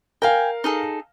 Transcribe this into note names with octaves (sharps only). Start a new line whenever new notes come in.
A#4 F5 G5 G#5
D#4 G#4 A4